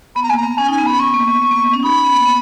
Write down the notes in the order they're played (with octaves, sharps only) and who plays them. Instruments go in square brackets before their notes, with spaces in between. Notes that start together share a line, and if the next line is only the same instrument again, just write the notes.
[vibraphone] B3 [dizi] B5
[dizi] A#5
[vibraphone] A#3 [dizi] G#5
[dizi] A#5
[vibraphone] B3
[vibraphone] C#4 [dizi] G#5
[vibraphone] D#4
[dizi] G#5
[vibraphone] B3
[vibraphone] C#4 [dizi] B5
[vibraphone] B3 [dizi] C#6
[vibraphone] A#3
B3
B3
A#3
B3
C#4
[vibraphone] D#4 [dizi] B5
[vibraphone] C#4
B3
A#3
B3